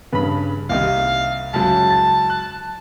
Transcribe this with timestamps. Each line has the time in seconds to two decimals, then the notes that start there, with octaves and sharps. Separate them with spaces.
0.12 G2 C#3 B4 B5
0.70 C2 C3 D#3 A#3 F5
1.53 C#2 F#2 F#3 A5
1.90 A6
2.30 F#6